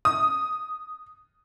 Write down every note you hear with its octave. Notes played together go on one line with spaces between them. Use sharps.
D#6